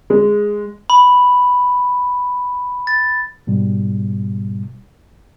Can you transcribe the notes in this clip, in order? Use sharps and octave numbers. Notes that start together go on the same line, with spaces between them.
G#3
B5
A6
G#2 B2 G3